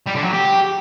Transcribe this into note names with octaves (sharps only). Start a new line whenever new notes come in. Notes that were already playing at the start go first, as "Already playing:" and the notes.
G3
D3
F#3
G4